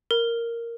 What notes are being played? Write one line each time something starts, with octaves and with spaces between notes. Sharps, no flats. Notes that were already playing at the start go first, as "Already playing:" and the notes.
A#4